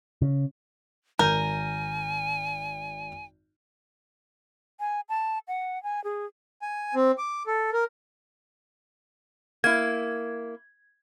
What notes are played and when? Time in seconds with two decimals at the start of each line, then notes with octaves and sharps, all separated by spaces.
0.22 C#3
1.19 G#1 A#4 G#5 G6
4.80 G#5
5.09 A5
5.48 F#5
5.83 G#5
6.04 G#4
6.62 G#5
6.95 C4
7.18 D6
7.47 A4
7.73 A#4
9.64 A#3 E4 G#6